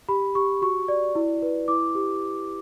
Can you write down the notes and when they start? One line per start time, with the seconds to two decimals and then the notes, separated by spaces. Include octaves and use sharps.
0.09 G4 B5
0.35 G4 C#6
0.62 F#4 C#6
0.88 D5
1.15 E4
1.42 B4
1.68 E4 D6
1.95 G4